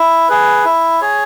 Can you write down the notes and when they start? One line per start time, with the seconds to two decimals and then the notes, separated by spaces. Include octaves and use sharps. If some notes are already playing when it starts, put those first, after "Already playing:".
Already playing: E4
0.29 G#4 B4
0.65 E4
1.01 G#4 C#5